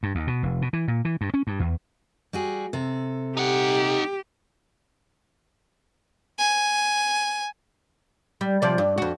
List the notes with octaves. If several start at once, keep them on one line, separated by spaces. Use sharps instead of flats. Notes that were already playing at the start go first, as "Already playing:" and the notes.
G2
D#2
B2
F1
B2
E3
A#2
E3
G2
C#4
G2
E2
G3 F#4 G#4
C3 A4
D#4 G4 F#5
G#5
G3
C3 F3 D5
G2
F2 F#4